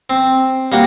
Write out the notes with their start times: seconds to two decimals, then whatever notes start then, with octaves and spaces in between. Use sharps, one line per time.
0.10 C4
0.72 G3 A#3 F#4